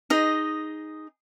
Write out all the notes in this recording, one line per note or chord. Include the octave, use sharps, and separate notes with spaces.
D#4 G#4 D#5